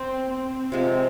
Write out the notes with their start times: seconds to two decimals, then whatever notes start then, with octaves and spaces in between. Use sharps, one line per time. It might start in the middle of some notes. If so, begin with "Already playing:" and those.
Already playing: C4
0.31 C4
0.72 C3 F3 G#3